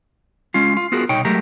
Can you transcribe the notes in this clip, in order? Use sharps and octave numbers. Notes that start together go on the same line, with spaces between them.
G#3 C#4 F4
F4
B3 F4 F#4 G#4 A#4
C2 B2 D#4 C#5 G5
F#3 G#3 A3 G4 A#4